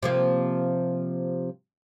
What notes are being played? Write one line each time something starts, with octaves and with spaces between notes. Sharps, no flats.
C3 F3 A#3